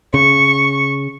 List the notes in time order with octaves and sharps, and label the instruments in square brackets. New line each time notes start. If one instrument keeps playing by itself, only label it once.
[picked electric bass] C#3 [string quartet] C#6